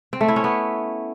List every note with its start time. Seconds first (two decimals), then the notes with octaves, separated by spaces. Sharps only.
0.13 C4
0.21 A3
0.28 E4
0.36 C#4
0.44 B3